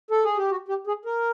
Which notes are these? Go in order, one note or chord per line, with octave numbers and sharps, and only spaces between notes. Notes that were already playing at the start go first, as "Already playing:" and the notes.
A4
G#4
G4
F#4
G4
G#4
A#4